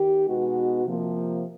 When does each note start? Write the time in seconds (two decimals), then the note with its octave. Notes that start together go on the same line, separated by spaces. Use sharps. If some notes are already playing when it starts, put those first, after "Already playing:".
Already playing: D#3 G4
0.27 B2 G#3 B3 D#4 F#4
0.85 C3 F3 A#3